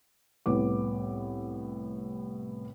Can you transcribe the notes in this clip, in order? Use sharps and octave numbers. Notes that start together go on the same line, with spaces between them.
C2 A2 B3 D6